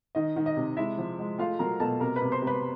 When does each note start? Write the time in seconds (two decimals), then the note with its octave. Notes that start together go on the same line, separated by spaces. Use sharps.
0.15 D#3 D#5
0.36 D#3
0.46 D#5
0.57 C3
0.77 G#3 E4 E5
0.98 F3
1.19 G#3
1.39 A3 F4 F5
1.59 F#3 A#4 A#5
1.80 B2 A4 A5
2.00 C3 A#4 A#5
2.16 B4 B5
2.22 C3
2.32 C5 C6
2.42 C3
2.47 B4 B5